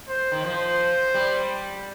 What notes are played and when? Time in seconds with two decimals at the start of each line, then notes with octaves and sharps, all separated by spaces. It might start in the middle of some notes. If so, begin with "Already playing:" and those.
0.08 C5
0.32 D#3
0.44 F3 C5
1.14 G3